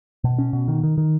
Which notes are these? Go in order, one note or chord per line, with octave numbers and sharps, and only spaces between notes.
B2
C#4
B2
D#3
D#3
D#3